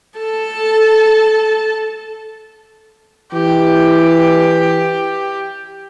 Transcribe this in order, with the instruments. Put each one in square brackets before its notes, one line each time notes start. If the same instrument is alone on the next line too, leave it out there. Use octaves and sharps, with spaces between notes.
[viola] A4 A5
[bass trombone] E3 [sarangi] G4